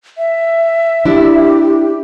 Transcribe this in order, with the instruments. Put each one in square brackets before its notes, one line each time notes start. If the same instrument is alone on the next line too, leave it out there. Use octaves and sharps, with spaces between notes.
[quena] E5
[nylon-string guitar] D4 E4 [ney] G4